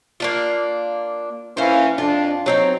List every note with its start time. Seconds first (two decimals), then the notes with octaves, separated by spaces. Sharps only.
0.20 A#3 D4 F4
1.57 E3 A#3 C#4 C5 F5
1.98 F2 D4 F4
2.46 F#3 C4 D#4 C#5